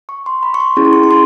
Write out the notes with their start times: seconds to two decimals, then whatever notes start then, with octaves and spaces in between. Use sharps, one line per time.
0.09 C#6
0.26 C6
0.43 B5
0.54 C#6
0.60 C6
0.76 C#4 E4 G#4 C#6
0.85 C6
0.93 C#6
1.03 C#6
1.11 C6